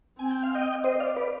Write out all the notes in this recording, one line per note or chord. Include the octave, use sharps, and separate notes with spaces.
C4 G#5
G5
F5
D#5 G5
C5 D#5
D5 F5
B4 D5